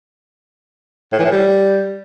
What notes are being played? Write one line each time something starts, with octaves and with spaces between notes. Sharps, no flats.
A2
E3
A2
G3